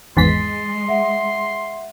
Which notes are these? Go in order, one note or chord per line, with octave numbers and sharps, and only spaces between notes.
G#1 E2 G#3 C6 A6 B6
E5 F#5